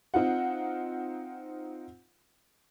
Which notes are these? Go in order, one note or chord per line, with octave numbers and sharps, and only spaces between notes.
C4 D#4 F4 F#5